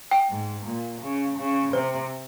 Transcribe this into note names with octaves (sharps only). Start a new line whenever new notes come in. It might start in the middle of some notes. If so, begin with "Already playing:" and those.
G5
G#2
A#2
C#3
C#3
C3 C5